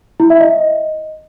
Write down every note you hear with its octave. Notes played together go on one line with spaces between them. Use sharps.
E4
E5
D#5